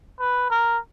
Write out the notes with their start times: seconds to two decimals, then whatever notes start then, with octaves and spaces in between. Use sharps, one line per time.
0.20 B4
0.50 A#4